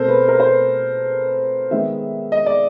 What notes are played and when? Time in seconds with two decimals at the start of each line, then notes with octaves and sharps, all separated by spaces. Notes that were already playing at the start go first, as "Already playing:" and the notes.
Already playing: B2 A3 C4 A4 A#4 C5
0.08 B4
0.28 A#4
0.40 C5
0.49 B4
1.71 D#3 G#3 B3 E5
2.32 D#5
2.46 D5